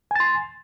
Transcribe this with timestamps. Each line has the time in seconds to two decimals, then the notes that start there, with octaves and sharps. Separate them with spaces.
0.11 G#5
0.16 A6
0.20 C6